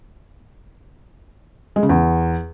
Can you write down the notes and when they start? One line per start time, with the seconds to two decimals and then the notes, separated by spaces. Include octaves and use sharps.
1.76 G#3
1.83 C#3
1.89 E2